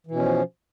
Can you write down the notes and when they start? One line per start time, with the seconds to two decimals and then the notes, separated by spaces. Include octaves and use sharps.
0.07 E3
0.11 B2
0.15 C#4
0.20 F3